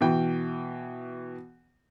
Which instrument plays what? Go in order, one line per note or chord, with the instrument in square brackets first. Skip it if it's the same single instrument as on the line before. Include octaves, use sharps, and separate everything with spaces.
[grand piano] B2 E3 G5